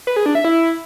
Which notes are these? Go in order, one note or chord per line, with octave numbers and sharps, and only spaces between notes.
B4
G#4
D4
E5
E4